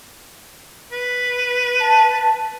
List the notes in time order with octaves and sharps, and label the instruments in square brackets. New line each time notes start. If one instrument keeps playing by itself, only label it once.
[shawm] B4
[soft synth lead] A5